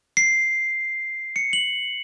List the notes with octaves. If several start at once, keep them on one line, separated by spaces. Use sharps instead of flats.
C7
C#7
F#7